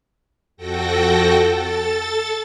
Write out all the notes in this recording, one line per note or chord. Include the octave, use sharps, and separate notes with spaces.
F2 F#4 A4 G5 A#6
A4 A6